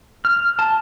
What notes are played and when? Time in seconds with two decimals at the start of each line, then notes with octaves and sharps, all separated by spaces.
0.25 F6
0.59 A5